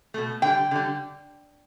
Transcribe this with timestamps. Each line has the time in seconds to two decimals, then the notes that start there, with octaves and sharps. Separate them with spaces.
0.14 B2 A3
0.42 D3 G3 G5
0.71 D3 G3